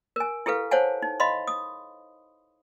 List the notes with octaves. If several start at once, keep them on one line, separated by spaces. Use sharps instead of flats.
A#4 G#5
E4 G4 A4 B4 F5
C5 C#5 F5 F#5 G#5 A5
D#4
D#5 F5 B5 C6
D#6